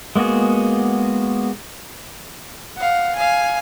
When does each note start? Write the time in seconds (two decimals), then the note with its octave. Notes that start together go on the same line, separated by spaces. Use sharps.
0.16 G#3 A#3 B3 F#4 G#4
2.77 F5 F#5
3.15 F5 G#5